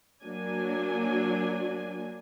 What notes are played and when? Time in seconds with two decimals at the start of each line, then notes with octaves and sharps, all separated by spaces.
0.23 F#3 A#3 D4 G#5